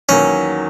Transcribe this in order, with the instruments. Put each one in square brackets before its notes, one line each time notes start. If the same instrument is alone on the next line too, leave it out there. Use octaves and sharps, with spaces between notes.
[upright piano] E2 D#3 F#3 A#3 [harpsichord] C#4